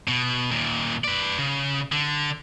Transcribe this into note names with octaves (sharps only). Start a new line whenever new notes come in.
B2
D#2 A#2
B4 D5
C#3
D3